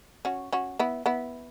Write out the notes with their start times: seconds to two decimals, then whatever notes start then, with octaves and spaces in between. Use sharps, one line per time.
0.25 C#4 F#4
0.52 C#4 F#4
0.79 B3 E4
1.06 B3 E4